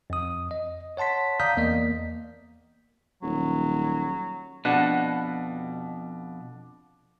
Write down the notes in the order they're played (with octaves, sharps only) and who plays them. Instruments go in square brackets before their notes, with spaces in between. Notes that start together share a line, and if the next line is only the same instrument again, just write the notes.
[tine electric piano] F2 D#6
D#5
C#5 F#5 A5 C6 B6
D5 F5 A#5 D#6 G6 B6
E2 A#3 D5 D#5 B6
[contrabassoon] D#1 [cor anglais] F#3
[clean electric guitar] F2 B2 [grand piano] D4 [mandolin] F#5